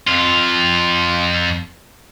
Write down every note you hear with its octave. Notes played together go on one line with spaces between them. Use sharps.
F2 F4